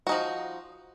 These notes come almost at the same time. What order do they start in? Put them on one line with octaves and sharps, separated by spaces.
F#4 D#4 F3